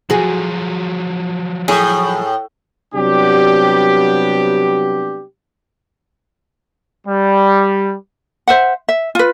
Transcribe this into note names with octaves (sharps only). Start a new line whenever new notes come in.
F3 F#3 F#4 G#4
A2 G#4
C3 F#3 G3 B3 D4 G4
G3
C5 E5 F#5
E5
F4 B4